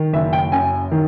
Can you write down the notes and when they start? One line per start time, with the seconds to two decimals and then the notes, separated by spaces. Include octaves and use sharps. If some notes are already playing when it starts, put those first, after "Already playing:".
Already playing: D#3
0.13 F#1 E5
0.33 G5
0.52 F#2 G#5
0.92 D#3